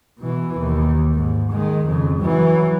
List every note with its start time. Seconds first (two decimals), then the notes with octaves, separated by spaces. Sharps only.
0.19 B2 E3
0.59 D#2
1.14 G#2
1.51 D#3 G#3
1.87 F2 C#3
2.19 E3 F#3